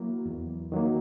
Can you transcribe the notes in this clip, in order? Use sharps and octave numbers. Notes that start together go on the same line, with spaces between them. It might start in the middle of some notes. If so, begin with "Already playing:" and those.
Already playing: F#3 A#3 E4
E2
D#3 F#3 A#3